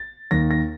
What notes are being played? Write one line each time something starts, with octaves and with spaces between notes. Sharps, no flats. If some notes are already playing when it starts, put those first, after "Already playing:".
Already playing: A6
D#2 D#3 A#6
A#6